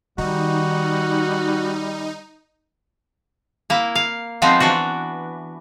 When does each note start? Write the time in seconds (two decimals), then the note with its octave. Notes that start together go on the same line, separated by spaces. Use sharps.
0.18 D#3 G3 D#4 F#4
3.70 A#3 E4
3.95 F5
4.42 F3 G#3 B3 C4 D#4 F4
4.60 E3 B3 D4 F#4